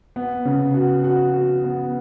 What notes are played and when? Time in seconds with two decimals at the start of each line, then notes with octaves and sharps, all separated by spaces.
0.16 B3
0.45 C#3
0.74 F#4
1.04 F#4
1.34 F#4
1.64 B3